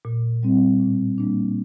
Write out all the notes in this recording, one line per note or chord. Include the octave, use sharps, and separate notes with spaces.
A#2
G3 C4
A2
G3 A#3 D4